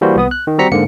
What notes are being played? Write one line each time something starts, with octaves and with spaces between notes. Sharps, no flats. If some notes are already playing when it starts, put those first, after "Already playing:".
E3 G3 A#3 F#4 C5
C2 B3 D#6
F#6
D#3
G3 C4 F#4 A#5 B6 C#7
G#2 D3 A#3 C#7